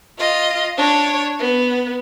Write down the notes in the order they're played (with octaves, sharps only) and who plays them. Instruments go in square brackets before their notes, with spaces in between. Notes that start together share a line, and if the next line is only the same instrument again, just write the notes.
[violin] F4 D#5
D4 C#5
B3